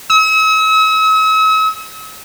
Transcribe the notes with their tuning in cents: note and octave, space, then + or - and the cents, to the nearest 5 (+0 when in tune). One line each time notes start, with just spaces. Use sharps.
E6 -45